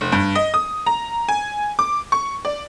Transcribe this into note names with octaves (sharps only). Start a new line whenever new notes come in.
F1
G2
D#5
D#6
A#5
G#5
D6
C#6
D5